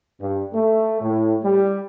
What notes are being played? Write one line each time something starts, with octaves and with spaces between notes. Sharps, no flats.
G2
A3
A2
G3